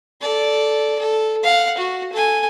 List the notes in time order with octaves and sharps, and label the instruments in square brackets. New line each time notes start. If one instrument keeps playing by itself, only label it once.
[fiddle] A4 D5
A4
F5 F#5
F#4
A4 G#5